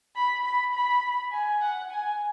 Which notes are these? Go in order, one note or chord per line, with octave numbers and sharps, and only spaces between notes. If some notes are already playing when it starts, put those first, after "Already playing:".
B5
B5
B5
G#5
F#5
G#5